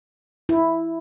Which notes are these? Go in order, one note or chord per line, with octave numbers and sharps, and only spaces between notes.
E4